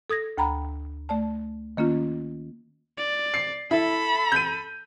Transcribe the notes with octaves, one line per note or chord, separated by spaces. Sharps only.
A4 D#6 G#6 A#6
D2 G5 A#5 B5
A3 D5 A5
D#3 A#3 C#4 F4
D5
C7
E4 A4 B5
G6 D#7